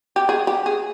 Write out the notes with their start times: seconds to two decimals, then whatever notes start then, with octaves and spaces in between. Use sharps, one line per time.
0.16 G4
0.29 G#4
0.47 G4
0.66 G#4